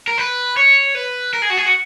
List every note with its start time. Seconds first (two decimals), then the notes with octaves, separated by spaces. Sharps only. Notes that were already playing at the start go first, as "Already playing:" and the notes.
0.08 A#4
0.18 B4
0.57 C#5
0.95 B4
1.33 A#4
1.42 G#4
1.50 F#4
1.57 G#4
1.66 F#4